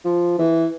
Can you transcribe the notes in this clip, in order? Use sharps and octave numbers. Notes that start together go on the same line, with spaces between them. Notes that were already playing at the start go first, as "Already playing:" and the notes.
F3
E3